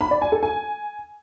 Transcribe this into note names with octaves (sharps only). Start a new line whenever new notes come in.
B5
D5
G#5
A4
G#5